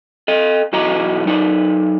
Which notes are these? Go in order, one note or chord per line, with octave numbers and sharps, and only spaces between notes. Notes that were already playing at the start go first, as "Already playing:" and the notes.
A4 D#5
B1 E3 F#4 D#5 A#5
F#3 D#4 D5